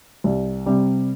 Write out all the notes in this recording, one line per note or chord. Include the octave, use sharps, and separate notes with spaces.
C2
C3 G3